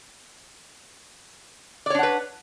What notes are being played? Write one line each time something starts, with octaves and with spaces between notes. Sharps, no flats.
D4 B4 C#5 D5 F#5